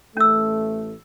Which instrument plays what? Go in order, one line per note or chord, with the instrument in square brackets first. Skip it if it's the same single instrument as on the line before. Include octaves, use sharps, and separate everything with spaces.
[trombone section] A1 A3 [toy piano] C#4 E6